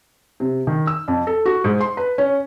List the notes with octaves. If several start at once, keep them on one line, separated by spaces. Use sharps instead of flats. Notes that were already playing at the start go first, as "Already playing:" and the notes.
C3
D#3
E6
F2
A4
F#4
G#2
C6
B4
C#4